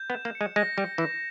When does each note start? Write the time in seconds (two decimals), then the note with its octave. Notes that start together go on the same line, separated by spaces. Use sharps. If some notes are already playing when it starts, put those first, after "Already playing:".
Already playing: G6
0.10 B3
0.14 E7
0.25 A#3
0.35 C#7
0.41 G#3
0.56 G#3 A#6
0.77 G3 G6
0.98 E3 E7